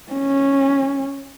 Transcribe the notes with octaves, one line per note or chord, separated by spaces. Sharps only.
C#4